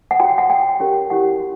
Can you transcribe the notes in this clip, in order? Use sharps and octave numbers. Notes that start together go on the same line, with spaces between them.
F#5
F#4 C#5 G5
F#5
F#4 C#5 G5
C#4 G4 A#4 C#5
C#4 E4 G4 C#5 F#5
F#4